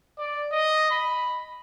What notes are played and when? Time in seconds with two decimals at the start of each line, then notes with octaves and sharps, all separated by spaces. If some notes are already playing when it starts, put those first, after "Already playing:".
0.18 D5
0.51 D#5
0.91 B5